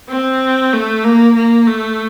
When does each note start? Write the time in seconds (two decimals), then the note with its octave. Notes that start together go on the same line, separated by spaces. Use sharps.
0.10 C4
0.73 A3
1.05 A#3
1.36 A#3
1.68 A3